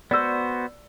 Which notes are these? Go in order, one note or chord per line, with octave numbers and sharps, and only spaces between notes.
B3 F#4 C5 D5 E6